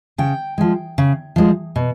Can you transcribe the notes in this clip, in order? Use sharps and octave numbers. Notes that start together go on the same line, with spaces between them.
C#3 G5
F3 G#3
C#3
F3 G#3
B2